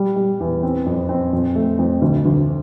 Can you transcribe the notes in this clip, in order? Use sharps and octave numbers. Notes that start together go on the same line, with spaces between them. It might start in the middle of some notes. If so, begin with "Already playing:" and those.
Already playing: G3
G3
E2
C4
F2
C4
F2
A3
F2
D2
D2